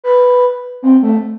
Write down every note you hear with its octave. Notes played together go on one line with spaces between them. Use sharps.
B4
C4
A3